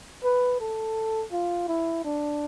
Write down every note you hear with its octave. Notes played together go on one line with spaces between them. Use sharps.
B4
A4
F4
E4
D4